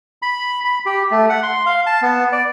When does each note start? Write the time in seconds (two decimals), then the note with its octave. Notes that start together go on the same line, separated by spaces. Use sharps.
0.22 B5
0.64 B5
0.86 G4
1.11 A3
1.29 F#5
1.43 C6
1.66 F5
1.86 A5
2.02 B3
2.32 D5